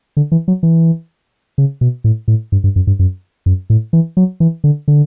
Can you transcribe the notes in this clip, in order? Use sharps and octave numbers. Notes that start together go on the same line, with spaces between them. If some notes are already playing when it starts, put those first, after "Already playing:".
D3
E3
F#3
E3
C#3
B2
A2
A2
G2
G2
F#2
G2
F#2
F#2
A2
E3
F#3
E3
D3
D3